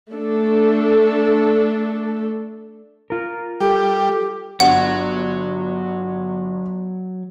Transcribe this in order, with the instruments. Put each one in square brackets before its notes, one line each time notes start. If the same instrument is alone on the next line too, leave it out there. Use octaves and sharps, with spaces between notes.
[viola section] A3 D4 A4
[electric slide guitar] F4 A#4
[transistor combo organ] G3 [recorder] G4 [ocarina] A4
[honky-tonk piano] G1 [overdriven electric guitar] F#3 [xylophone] F#5